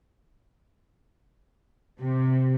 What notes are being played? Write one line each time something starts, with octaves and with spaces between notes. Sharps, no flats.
C3